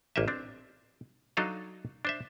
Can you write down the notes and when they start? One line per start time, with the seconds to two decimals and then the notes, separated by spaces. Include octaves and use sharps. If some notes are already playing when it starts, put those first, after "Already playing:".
0.16 A1 A#3 G4 D#5 E5
0.28 C4 D4
1.37 F#3 D4 D#4 A4 D#5 F5
2.05 D4 C5 E5